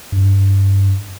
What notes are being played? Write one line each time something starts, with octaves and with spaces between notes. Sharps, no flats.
G2